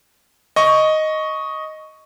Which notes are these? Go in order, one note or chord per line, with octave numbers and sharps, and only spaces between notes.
D#5 C#6